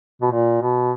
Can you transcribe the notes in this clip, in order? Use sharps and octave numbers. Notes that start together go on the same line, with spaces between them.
B2
A#2
B2